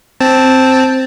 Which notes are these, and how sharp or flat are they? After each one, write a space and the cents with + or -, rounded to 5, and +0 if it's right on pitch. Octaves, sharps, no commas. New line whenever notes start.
C4 +0 A5 +0